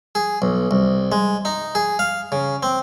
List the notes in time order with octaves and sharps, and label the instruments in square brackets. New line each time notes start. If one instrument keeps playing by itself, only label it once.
[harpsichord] G#4
B1
C2
G#3
D#4
G#4
F5
C#3
C4